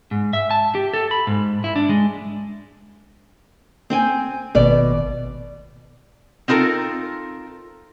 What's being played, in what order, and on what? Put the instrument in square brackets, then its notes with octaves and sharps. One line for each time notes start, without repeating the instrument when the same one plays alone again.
[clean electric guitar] G#2
E5
A5
G4
A4
B5
G#2
E4
D4
G#3
[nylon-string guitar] C4 G5 G#5
[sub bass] G#1 [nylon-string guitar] B2 D5
[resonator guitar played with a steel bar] C4 D#4 F4 A4 A#4